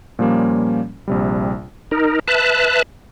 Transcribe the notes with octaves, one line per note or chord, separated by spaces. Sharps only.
A#2 F3 G3 A#3 C#4
A#1 C3 G3
D#4 A#4
B4 E5 A5 F#6